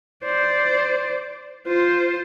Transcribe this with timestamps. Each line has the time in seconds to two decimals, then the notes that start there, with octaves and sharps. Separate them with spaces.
0.24 C5 D5
1.67 F4 C5